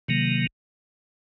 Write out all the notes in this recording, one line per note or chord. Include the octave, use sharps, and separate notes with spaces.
C3 D#3 F#3 A#3